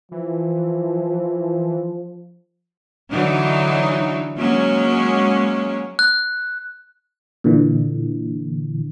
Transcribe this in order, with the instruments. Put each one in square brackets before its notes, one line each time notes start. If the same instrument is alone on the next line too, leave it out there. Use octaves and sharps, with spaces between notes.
[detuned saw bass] E3 [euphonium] F3
[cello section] D3 E3 F#3 D#4
F#3 G#3 A#3 C#4
[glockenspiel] F#6
[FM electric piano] A#2 D3 E3